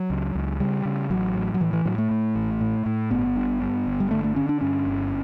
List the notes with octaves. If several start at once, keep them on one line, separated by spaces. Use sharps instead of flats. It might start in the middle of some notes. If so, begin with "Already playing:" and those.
Already playing: F#3
C#2
C#2
C#3 G3
C#3
A1 F#3
A2
F#3
A2 E3
E3
A2 F#3
A3
A2
A1
A2
A2
G1 B3
G2
G2
G1
G3
D3 A3
A3
D3 C#4
D4
G2 C#4
G1